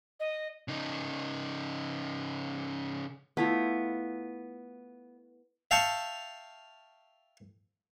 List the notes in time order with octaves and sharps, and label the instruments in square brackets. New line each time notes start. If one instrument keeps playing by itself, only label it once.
[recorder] D#5
[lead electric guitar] C#3 D#4
[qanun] A3 E4 F4 [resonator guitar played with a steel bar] B3
[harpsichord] E5 F5 G5 A5 C#6